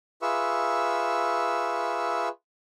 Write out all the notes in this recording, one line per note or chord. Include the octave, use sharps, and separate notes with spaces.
F4 G#4 B4 E5 C#6 E6